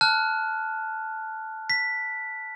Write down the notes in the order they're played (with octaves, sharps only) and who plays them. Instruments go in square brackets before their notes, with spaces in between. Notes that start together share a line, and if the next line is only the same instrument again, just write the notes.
[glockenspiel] A5 F6 F#6
B6